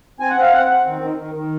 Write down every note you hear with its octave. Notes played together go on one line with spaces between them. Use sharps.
C4 G#5
F#5
C4
F5
C4 F#5
C4
D#3
D#3
D#3
D#3